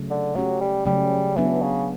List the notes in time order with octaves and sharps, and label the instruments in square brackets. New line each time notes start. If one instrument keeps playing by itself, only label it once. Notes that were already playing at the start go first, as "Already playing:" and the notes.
Already playing: [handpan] C#3 F#3 A3
[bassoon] D3
[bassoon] F#3 [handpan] A3 C#4 G4
[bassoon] G3
[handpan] C#3 F#3 A3 C#4 [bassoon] G3
[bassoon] E3 [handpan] F#3 B3 D4
[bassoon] C#3